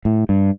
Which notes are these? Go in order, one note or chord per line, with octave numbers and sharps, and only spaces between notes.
A2
G2